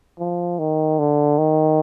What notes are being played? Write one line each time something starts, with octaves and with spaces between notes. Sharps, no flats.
F3
D#3
D3
D#3